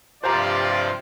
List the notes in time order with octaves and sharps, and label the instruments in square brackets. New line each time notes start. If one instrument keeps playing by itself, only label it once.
[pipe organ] G2 C3 F3 [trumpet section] F4 D5 [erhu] G4 [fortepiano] C5 A#5